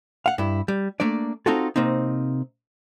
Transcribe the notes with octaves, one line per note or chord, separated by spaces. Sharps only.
F5 F#5
G2 E4
G3
A3 A#3 D4 D5
C4 D#4 F4 F#4 A4
C3 A#3 C4 D#4